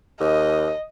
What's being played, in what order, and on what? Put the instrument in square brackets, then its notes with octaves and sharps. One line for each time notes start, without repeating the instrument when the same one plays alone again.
[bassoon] D#2 [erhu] D#5